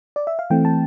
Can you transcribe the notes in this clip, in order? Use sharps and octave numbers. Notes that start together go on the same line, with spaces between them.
D5
E5
F5
E3 A3 C4 G5
A5